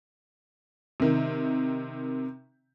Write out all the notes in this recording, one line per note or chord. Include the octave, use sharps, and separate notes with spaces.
C3 D#3